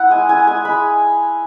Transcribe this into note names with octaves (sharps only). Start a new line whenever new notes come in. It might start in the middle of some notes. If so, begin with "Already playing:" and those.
Already playing: E4 F#5
G#3 G#5
E4 G#5
G#3 G#5
G#3 B5